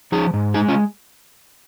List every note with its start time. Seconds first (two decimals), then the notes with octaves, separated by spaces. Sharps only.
0.12 F3 D#4 G#4
0.34 G#2
0.54 G#3 D#4 G#4
0.69 C#4 F4